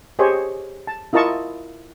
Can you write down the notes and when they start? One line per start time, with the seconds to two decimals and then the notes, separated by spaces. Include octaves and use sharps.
0.19 G4 G#4 C5 C#5 D#5
0.87 A5
1.13 E4 F4 A#4 D#5 A5 C#6